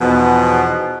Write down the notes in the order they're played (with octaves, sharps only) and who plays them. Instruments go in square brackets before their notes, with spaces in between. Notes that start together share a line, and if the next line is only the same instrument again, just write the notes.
[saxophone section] E2 B2 F3 B3 D#4